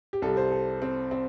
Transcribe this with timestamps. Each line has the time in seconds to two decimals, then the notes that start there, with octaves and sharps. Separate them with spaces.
0.13 G4
0.22 C2 C3 G3 A4
0.37 C5
0.52 A4
0.82 C4
1.11 C4